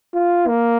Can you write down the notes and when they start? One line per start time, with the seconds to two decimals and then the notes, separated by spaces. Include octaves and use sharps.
0.15 F4
0.48 A#3